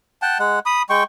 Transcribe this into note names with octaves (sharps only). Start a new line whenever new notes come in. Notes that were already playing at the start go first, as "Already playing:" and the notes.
F#5 G5 A5
G#3 F#5
B5 D#6
G#3 G5 C#6